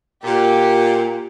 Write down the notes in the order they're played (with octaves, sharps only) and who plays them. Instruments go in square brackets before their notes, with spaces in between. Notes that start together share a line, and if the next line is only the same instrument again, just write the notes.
[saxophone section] A#2 [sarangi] G4